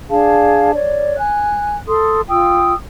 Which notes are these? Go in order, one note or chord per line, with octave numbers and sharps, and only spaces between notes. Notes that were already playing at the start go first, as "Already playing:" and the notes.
D4 G#4 F5 A5
C#5 D5
G#5 F#6
A4 C6 D#6
F4 G5 D#6 E6